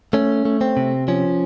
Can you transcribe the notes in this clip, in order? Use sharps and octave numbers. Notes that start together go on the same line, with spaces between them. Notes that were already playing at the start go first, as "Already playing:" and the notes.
A3 C#4
A3
C4
C3
F3 C#4